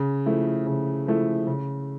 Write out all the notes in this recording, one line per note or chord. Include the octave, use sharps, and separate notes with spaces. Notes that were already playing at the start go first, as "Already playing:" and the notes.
Already playing: C#3
F3 A3 E4
C#3
F3 A3 E4
C#3